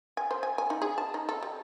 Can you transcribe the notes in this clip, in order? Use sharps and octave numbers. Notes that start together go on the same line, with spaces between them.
G#5
C5
G#5
G#5
D#4
G#4
A5
D#4
A4
G3